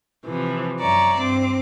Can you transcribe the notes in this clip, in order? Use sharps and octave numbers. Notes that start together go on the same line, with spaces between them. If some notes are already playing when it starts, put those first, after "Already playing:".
C3 E3 F3
F#2 C#5 D5 E5 A#5
G2 C4 D6